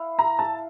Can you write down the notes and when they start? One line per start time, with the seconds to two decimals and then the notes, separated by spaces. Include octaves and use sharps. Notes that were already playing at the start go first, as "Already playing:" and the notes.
Already playing: E4 F5
0.19 A#5
0.39 A5